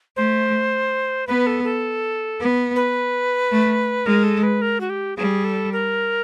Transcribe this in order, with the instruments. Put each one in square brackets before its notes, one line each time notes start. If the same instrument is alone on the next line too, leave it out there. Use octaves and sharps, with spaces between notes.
[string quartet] A3 [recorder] C5
[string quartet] B3 [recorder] B4
[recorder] A4
A4
[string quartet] B3
[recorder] B4
[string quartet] A3
[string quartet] G#3 [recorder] A#4
[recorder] A4
B4
A#4
F#4
G4
[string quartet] G3 [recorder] G#4
[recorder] A4
A#4